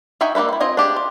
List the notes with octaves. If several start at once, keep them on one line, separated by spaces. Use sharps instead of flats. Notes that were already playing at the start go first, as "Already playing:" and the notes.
D#4 F#4 E5 G5 G#5
G3 A#3 F4 B4 E5
E4 F4
C4 F4 D#5 G#5
D4 G4 G#4
F4